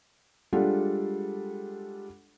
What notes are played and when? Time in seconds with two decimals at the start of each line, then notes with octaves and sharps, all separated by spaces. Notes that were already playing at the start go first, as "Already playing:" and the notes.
0.53 G3 G#3 D4 F4 A4 F#5